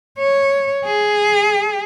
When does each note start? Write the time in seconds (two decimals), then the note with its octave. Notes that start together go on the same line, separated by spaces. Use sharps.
0.19 C#5
0.86 G#4